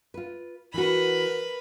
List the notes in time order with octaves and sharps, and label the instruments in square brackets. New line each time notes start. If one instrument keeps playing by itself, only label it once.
[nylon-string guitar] F4 B4
[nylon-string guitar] E3 F#4 [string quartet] A#4 B4 B5